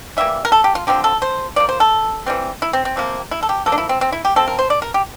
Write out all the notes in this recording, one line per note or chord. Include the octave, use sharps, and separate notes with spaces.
E3 G3 A#3 E5
A#4
A4
G4
F4
D3 F3 C4 G4
A4
C5
F3 A#3 D5
C5
A4
E3 G3 C4
E4
C4
C4
C3 F3 A#3
E4
A4
G4
F3 A#3 A4
D4
E4
C4
C4
E4
G4
F3 C4 A4
A#4
C5
D5
A#4
G4